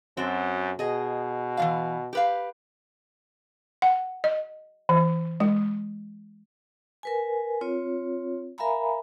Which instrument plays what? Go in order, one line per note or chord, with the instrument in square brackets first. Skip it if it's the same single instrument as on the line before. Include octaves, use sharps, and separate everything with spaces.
[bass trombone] F#2 [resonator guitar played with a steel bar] C4 F#4 A4
[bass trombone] B2 [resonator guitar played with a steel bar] G#4 D#5
[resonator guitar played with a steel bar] E3 G3 F5
G4 B4 F5
[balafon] F#5
D#5
E3
G#3
[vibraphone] A#4 B4 G#5
C4 F4 C#5
A#4 E5 F5 G#5 A#5 B5